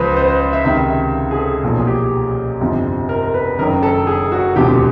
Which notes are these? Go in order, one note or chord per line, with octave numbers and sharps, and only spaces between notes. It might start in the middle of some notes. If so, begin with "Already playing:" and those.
Already playing: C#2 C#3 F3 B4 C5
C5
C5
E5
C#2 C3 D#3 E5
E5
G#4
A4
B1 A#2 F3
G#4
G4
G1 F2 C3 F3
A#4
A#4
B4
F#1 F#2 D#3 A#4
A4
G#4
F#4
E1 D2 C3 F3 G4